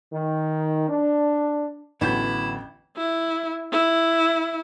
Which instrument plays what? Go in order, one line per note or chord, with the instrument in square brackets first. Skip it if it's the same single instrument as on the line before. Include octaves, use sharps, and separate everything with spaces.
[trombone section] D#3
D4
[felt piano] A1 G6 [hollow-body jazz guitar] D3 F#3 B3 [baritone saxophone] E4
[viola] E4
E4